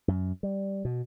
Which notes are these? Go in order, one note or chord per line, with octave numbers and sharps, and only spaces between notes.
F#2
G3
B2